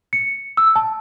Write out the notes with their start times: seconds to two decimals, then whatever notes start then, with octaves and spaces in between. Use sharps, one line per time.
0.13 C#7
0.57 E6
0.76 A5